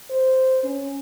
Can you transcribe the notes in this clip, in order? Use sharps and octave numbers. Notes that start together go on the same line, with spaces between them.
C5
C#4